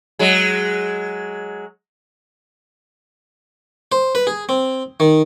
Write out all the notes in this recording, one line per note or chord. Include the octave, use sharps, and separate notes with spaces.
F#3 G#3
C5
B4
G#4
C4
D#3